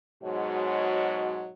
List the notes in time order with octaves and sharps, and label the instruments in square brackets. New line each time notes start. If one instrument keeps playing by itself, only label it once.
[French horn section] G#2 B2 F#3 G#3 F#4 C#5